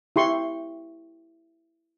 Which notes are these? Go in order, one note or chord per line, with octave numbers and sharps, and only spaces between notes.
E4 G4 C6 C#6